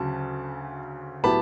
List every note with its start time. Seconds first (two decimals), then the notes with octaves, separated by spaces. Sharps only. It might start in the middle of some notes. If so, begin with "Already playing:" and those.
Already playing: D2 C#3 F#3 A5
1.24 A2 F#3 B3 E4 G4 A5 B5